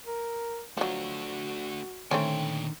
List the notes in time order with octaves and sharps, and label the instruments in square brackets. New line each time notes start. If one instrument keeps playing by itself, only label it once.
[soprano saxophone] A#4
[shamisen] F3 F#3 [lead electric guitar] A3 D4 [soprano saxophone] F#4
[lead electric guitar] A#2 G5 [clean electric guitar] D3 D#3 [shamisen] A3 C4 C#4